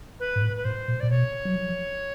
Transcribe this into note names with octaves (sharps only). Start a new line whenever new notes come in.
B4
G#2
A2
B4
A2 C5
A#2
A#2 D5
B2 C#5
F#3
F3